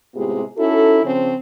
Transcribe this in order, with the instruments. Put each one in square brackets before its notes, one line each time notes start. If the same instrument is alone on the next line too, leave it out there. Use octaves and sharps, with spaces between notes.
[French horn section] A2 C3 G#3 B3 F4 G4
C#4 D#4 E4 F#4 A4
C#3 F3 C4 C#4